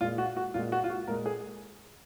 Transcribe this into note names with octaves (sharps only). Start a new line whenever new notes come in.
A#2 G#3 F4
F#4
F#4
A#2 G#3 F4
F#4
F4
F#4
A#2 G#3 A#4
G#4